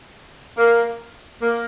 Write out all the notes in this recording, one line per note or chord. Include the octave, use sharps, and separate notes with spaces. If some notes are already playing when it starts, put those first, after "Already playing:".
A#3
A#3